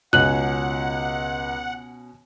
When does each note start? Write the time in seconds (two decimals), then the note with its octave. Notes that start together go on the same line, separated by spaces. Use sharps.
0.13 C#2 B2 C#4 F#5 G#5 F#6 F#7